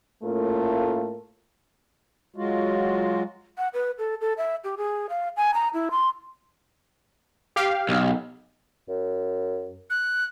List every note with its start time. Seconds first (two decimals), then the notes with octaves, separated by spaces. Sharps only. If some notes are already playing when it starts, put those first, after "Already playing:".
0.23 A2 A3 A#3 C#4 F4 A#4
2.36 F#3 G#3 F4 F#4
3.58 F#5
3.74 B4
3.98 A4
4.21 A4
4.38 E5
4.64 G4
4.77 G#4
5.09 F5
5.37 G#5
5.54 A#5
5.74 E4
5.91 C6
7.56 G4 F5
7.89 B1
8.89 F#2
9.90 F#6